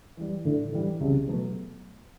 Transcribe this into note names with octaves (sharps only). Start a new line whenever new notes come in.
E3 G3
A2 D3
E3 G3
C2 C#3
B2 F#3 A3